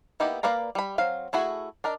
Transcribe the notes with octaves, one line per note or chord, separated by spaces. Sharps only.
A#3 B3 D#4 E4 G4
A#3 B4 D5 F5 A#5
G3 B5
F#3 C4 F5
A3 E4 F#4 G#4
D4 A#4 D#5